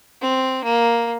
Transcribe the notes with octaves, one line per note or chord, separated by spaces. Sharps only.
C4
A#3